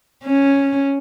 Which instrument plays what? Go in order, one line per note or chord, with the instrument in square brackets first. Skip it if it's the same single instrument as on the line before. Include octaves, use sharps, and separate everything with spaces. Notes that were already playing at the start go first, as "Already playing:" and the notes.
[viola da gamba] C#4